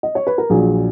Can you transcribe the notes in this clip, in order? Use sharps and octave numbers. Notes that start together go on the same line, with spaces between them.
D#5
C#5
B4
A#4
A#1 A#2 F#3 G#4